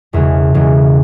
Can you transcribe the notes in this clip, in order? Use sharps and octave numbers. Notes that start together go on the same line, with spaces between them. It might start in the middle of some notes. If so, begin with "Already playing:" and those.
E1 E2 C#3 G#3
E1 E2 C#3 G#3